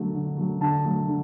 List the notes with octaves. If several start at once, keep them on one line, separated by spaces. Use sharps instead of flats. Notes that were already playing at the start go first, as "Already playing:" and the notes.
Already playing: D3 F#3 A3
D3
F#3 A3
D3 A5
F#3 A3
D3